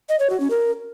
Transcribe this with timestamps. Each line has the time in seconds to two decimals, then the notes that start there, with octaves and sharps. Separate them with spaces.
0.09 D#5
0.19 C#5
0.30 F#4
0.40 C#4
0.50 A#4